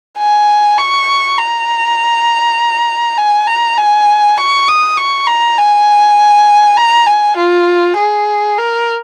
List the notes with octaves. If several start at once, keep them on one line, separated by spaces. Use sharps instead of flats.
G#5
C#6
A#5
G#5
A#5
G#5
C#6
D#6
C#6
A#5
G#5
A#5
G#5
F4
G#4
A#4